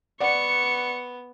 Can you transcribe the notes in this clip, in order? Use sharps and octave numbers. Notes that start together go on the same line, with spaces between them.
B3 D5 F#5 C#6 C#7